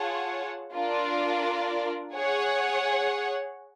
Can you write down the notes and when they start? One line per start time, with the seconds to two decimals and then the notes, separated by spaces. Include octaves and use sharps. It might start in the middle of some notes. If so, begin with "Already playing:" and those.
Already playing: F4 G#4 C#5 F#5 A5
0.74 D4 F4 A#4 D5
2.15 G#4 C#5 F#5